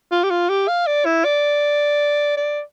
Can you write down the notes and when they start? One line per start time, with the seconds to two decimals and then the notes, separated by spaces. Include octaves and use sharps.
0.11 F4
0.24 G4
0.31 F4
0.49 G4
0.68 F5
0.87 D5
1.05 E4
1.25 D5
2.37 D5